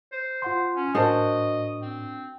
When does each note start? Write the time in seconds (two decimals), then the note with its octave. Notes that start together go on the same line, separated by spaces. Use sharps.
0.12 C5
0.42 F4 F#5 C6
0.75 C#4
0.95 A2 D4 F#4 A#4 C5 D#5 A5
1.82 C4